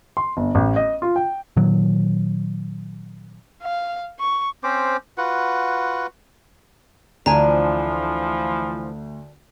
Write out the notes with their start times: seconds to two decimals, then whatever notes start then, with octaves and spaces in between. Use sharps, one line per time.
0.17 C6
0.37 G1
0.55 A1
0.76 D#5
1.02 F4
1.16 G5
1.56 A#2 D#3 F#3
3.63 F5
4.19 C#6
4.63 C4 C#4 C5 D6
5.18 F4 F#4 B4 F#5
7.26 D2 E3 F3 D4 G#5 A#5